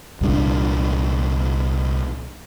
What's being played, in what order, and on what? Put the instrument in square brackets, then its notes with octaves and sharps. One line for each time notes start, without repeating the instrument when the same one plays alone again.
[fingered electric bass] C2 A#2 D4